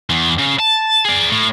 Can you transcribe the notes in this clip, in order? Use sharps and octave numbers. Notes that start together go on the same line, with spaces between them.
E2
C#3
A5
G#4 D5
A2